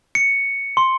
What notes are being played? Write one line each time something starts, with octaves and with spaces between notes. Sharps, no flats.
C#7
C6